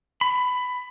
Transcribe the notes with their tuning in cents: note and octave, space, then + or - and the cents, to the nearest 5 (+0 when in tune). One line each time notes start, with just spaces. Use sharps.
B5 +15